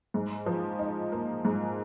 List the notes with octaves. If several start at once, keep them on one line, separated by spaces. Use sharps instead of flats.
G#2
F3
D#4
A#3
G#2